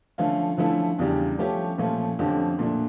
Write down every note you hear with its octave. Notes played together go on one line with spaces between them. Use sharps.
D3 F3 A3 C#4 F4
D3 F3 A3 C#4 E4
E2 C#3 G3 D4 G4
F3 A3 C#4 G4 C#5
A#2 F3 A3 C#4
F2 D3 F3 C#4 G4
A#2 A3 D4